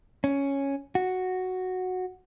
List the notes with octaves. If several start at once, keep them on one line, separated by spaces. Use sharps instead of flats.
C#4
F#4